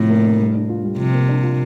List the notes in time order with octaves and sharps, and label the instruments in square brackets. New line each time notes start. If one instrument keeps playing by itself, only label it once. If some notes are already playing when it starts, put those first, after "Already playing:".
Already playing: [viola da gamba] A2 [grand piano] C3 F3
[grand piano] A#3
D4
G3
D4
F4
G3
[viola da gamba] C3 [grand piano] F3
[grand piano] A#3
D4
F4